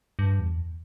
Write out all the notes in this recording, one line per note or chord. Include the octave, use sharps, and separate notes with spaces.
G2
E2